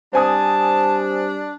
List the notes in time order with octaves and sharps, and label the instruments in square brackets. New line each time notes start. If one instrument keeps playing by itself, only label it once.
[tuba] G3 [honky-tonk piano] C4 G#5 D#6 [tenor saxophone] D4 [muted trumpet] A5